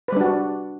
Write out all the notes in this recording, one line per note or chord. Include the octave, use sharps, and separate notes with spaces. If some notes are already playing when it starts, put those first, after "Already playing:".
G3 D4 F#4 B4